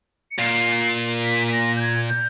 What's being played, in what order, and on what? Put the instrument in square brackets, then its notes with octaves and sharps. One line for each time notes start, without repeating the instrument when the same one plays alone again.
[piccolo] C#7
[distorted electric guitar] A#2 [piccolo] C7
[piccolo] B6
B6
A#6
G6
G#6
G6